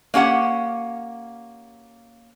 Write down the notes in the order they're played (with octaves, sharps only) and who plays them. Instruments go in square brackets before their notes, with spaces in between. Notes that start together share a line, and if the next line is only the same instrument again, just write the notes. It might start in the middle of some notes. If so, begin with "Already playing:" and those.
[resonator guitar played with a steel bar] A#3 C#4 G4 F#5